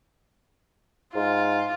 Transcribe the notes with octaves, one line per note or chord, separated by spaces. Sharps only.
G#2 F4